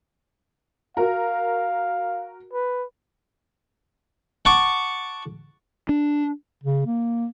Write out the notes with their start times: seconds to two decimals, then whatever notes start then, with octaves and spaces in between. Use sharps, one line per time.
0.97 F#4 A#4 F5
2.53 B4
4.45 F#5 A5 C#6 D6
5.89 D4
6.64 C#3
6.86 A#3